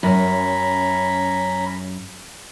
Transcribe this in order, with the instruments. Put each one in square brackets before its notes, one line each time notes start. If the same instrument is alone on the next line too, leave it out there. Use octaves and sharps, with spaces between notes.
[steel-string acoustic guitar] F#2 [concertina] C#4 A#5 B5